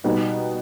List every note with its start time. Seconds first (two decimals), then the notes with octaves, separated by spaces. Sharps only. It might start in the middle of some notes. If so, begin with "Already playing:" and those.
0.04 B2 G3 B3 D#4